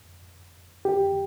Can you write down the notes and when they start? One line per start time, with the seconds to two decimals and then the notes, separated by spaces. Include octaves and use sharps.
0.85 G4